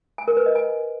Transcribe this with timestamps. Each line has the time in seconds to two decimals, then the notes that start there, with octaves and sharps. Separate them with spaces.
0.18 G#5
0.28 A#4
0.37 B4
0.46 D#5
0.55 G#5